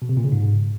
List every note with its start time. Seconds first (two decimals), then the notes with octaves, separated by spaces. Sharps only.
0.02 B2
0.09 C3
0.17 A#2
0.24 C#3
0.32 G#2